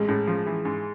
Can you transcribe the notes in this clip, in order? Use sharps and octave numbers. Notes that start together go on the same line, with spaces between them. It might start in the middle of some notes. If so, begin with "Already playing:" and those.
Already playing: A1 G#3
A2
F3
E3
G#2